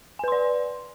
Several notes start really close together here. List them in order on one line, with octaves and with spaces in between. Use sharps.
G#5 B4 C6 D5